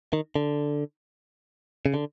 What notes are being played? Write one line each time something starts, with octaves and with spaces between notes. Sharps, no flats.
D#3
D3
C#3
D3